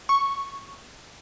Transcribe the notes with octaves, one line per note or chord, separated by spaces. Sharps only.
C#6